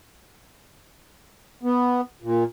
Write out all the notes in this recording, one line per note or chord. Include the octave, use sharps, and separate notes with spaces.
B3
A#2